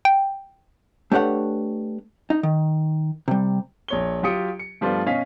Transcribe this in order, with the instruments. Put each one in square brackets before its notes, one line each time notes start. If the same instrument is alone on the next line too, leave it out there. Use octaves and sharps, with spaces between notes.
[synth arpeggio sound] G5
[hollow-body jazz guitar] A3 D4 G4 B4 C#5 F#5
D#4
D#3
C3 G3
[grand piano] A#1 C#5 G7
F#3 F4 G4 D#6 C#7 D7
C#7
G2 F3 G3 A3 B3 F4
B2 C#4 D#5 F5 B6